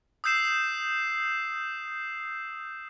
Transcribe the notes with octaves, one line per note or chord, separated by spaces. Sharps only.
D#6 E6 G6 C7 E7